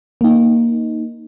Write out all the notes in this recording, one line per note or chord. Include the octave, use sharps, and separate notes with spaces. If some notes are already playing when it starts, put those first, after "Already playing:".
A#3 D#4